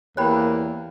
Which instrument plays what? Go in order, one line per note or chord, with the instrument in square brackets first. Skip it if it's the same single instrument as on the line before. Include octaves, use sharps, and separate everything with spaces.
[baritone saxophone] E2 [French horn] A#3 [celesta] G4 G5 F#6 [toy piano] C#5 B5